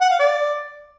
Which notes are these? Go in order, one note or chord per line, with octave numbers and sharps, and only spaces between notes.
F#5
F5
D5